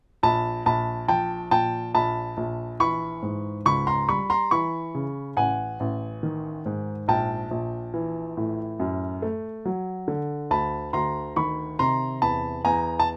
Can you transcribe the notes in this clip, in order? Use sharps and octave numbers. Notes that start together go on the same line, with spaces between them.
A#1 A5 B5
A#1 A5 B5
F3 G5 A5
A#2 G5 A5
A#1 A5 B5
A#1
E3 B5 C#6
G#2
C#2 B5 C#6
A#5 C6
G3 B5 C#6
A#5 C6
E3 B5 C#6
C#3
A1 F#5 G#5
A1
D#3
G#2
A#1 G5 A5
A#1
E3
A2
F#2
A3
F#3
D3
D2 A5 B5
D2 A#5 C6
D#3 B5 C#6
C3 A#5 C6
E2 A5 B5
E2 G#5 A#5
A5